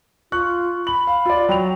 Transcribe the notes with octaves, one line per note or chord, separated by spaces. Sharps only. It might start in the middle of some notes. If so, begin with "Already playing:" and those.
F4 C#6 F#6
B5 F#7
F5
F4 D5
F#3 G5 F7